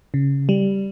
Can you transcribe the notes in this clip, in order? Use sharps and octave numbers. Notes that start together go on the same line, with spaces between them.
C#3
G3